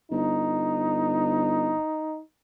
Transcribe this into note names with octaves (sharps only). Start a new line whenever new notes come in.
G1 D#4